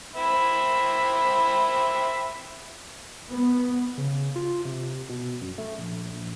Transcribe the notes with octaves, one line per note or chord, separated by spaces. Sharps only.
C4 E5 B5
B3
C#3
F4
C3
B2
F#2
A3
A#1
A#1